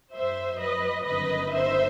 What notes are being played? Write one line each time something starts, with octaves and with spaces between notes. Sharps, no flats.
F#2 F#3 C5 E5
B4 D#5
G1 F#2 D#3 B4 D#5
C5 E5